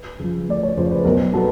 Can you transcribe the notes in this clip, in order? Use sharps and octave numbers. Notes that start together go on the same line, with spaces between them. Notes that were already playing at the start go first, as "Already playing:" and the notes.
Already playing: B4
C#3 F3
D2 D5
C#5
C#3 F3 C5
B4
B1 A#4
B2 F#3 B3 A4